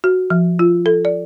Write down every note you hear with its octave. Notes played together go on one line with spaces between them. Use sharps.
F#4
F3
F4
A4
D5